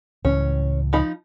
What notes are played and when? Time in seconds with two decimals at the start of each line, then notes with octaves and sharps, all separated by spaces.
0.25 C#2 A2 E3 C#4
0.93 F3 D#4 B5